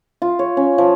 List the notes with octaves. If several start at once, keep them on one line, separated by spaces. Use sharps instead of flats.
F4
C#5
C#4
F3